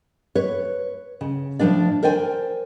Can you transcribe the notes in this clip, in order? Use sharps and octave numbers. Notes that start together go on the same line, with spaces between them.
B4 C#5
C#3
A2 F3 G#3 D4 D5
A#4 C5 D5 G5 G#5